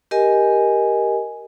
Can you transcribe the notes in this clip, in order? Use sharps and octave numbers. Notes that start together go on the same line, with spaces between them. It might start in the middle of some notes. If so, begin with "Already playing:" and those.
G4 A#4 D#5 G#5